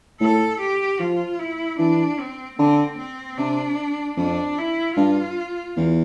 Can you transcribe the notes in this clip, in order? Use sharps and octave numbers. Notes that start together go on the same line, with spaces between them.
A2 A4
G4
F3 F4
E4
E3 D4
C4
D3 C4
C4
C3 D4
F2 D4
E4
G2 F4
E2